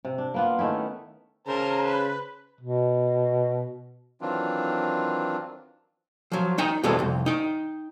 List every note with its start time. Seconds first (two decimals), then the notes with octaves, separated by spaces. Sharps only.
0.05 C3
0.18 D4
0.34 A#3 B3 F4
0.59 D#3 A3 C#4 E4
1.47 C#3 A#4 C5 G#5 A5
1.85 B4
2.61 B2
4.21 D#3 E3 F#3 C4 D4 F4
6.32 F3 F#3
6.58 D#4 G5 A#5
6.83 E2 B2 G3 G#3 C4 A4
6.99 C2 F2
7.26 D#4 G5